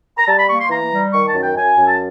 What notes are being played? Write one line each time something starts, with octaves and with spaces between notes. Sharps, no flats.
A#5
G3 A5
B5
A#3 C#6
C6
E3 A#5
G3
D#3 C#6
A5
F#2
G5
F#2 G#5
F#2
A5